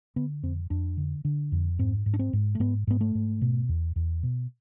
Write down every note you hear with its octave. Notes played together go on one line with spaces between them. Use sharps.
D3 B3
F2 C4
F2 D4
D3
D3
F2
G#2 C4
G#2
D4
C4
G#2
A3
G#2 B3
G#2 B3
A3
G#2
B2
E2
E2
B2